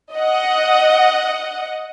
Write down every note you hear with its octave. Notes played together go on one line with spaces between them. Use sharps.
D#5 F#5